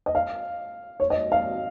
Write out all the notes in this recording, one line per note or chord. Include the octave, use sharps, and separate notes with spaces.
D#5
F5
C#5
D#5
F5